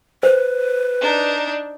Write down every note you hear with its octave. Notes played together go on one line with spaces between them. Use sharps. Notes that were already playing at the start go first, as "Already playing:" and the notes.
B4 C5
D4 D#4